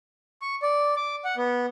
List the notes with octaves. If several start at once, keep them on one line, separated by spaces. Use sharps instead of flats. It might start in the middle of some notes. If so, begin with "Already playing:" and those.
C#6
D5
D6
F#5
B3